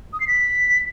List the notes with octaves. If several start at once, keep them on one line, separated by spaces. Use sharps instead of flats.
D#6
C7
B6